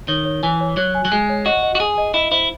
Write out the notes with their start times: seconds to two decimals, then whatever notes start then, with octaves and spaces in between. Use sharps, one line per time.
0.08 D#3 C#5
0.25 C#5
0.43 E3 G#5
0.61 C#5
0.77 F#3 C#5
0.95 G#5
1.05 F#3
1.12 G#3 G#5
1.29 C#5
1.46 F#4 D#5
1.63 D#5
1.75 F#4
1.80 G#4 G#5
1.98 D#5
2.14 E4 D#5
2.32 E4 C5